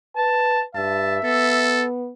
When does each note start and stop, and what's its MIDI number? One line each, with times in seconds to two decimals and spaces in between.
0.16 0.63 71
0.16 0.61 81
0.75 1.20 43
0.75 1.85 76
0.75 1.18 81
1.24 2.11 59
1.24 1.85 69